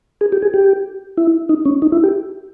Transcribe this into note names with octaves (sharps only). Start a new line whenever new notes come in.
G#4
G4
G#4
G4
E4
D#4
C#4
D#4
E4
G4